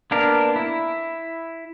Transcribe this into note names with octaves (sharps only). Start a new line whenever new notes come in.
A#3 B3 D4 A#4
E4